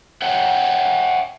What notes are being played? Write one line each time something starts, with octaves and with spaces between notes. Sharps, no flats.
C#5 E5 F#5 G5